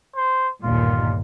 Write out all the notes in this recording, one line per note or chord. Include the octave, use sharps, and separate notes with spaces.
C5
G1 D#2 A#2 F4